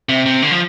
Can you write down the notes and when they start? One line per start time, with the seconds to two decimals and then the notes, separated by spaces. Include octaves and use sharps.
0.09 C3
0.26 C3
0.42 D3
0.51 F3